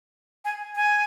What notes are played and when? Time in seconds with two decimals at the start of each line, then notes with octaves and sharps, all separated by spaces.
0.45 G#5
0.76 G#5